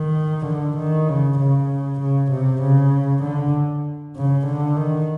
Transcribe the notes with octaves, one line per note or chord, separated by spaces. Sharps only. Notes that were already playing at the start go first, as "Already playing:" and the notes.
Already playing: D#3
D3
D#3
C#3
C#3
C#3
C3
C#3
D3
C#3
D3
D#3